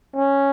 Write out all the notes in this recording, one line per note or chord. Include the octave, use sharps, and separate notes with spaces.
C#4